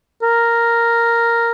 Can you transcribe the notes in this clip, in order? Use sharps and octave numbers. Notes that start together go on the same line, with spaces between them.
A#4